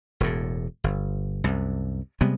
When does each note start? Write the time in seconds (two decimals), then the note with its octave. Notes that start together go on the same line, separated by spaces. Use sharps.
0.20 E1 E2 A2
0.84 G1
1.44 C2 F#2
2.21 C3 G3 G#3 B3